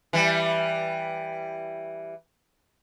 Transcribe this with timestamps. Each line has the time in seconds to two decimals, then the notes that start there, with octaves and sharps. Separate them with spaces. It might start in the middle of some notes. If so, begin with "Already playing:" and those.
0.13 E3 G3